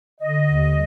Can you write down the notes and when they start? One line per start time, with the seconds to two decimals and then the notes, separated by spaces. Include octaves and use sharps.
0.21 D3 D#5
0.45 D#2
0.71 G3